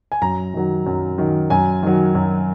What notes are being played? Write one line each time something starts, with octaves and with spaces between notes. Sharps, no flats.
G#5
F#2 A#5
D#3 F#3
F#2
D#3 F#3
F#2 G#5
D#3 F#3
F#2